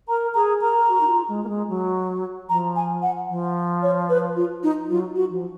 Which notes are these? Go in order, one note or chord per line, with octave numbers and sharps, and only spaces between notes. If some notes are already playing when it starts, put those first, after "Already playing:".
A#4 A#5
G#4 A#5
A#4 A#5
F#4
D#4
F4
G#3
A#3
G#3
F#3
F3 A#5
G#5
F#5
F3
C#5
B4
F4
D#4
F#3 F4
F#4
F3